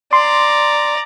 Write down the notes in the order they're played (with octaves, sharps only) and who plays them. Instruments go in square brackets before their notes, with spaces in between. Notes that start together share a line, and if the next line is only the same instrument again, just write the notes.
[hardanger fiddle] D5 A#5 [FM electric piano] C6